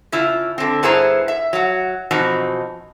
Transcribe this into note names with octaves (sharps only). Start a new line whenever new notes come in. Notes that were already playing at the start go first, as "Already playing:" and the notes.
C#3 E4 F4
D3 C4
G2 B3 E4 G#4 C5 A#5
E5
F#3 F#5
B2 E3 F3 C4 D#4 F#4